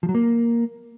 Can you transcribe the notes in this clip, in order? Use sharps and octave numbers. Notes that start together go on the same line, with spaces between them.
F3
F#3
A#3